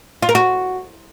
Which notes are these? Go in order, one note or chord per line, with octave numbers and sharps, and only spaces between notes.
F4
A#4
F#4